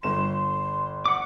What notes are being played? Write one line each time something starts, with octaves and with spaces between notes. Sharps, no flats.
G1 C6 E7
F#5 D6